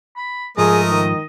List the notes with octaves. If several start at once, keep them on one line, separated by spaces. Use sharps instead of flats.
B5
G#2 F3 A3 G#4 A#4 D#5 D#6
D#3